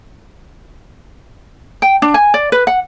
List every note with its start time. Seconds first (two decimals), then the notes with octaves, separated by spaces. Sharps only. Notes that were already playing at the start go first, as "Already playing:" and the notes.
1.82 G5
2.02 D4
2.14 G#5
2.34 D5
2.52 B4
2.67 F#5